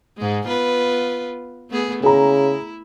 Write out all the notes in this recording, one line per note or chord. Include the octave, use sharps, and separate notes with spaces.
G#2 G#3
B3 F4 B4
A3 B3 G#4
C#3 E4 G#4 A#5